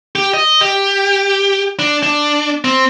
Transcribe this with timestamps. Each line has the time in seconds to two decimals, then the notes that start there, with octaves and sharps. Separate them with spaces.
0.15 G4
0.34 D#5
0.61 G4
1.79 D4
2.03 D4
2.65 C4